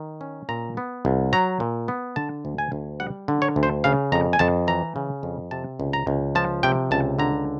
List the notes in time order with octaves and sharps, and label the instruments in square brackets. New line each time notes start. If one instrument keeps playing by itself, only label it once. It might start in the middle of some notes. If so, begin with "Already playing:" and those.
Already playing: [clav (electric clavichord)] D#3
C#4
A#2 A#5
B3
C2
F#3 A#5
A#2
B3
D3 A5
D2
G#5
D2
G3 F#5
D3
C#5
D2
C5
C#3 F5
F2 A#5
G#5
F2 A5
E3 A#5
C#3
F2
C3 A5
C#2
A#5
C#2
F3 A5
C3 G5
C#2 A5
D3 A#5